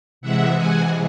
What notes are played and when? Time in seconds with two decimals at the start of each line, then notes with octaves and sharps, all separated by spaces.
0.21 C3 E3 G#3 E5 F#5
0.55 F#5 G#5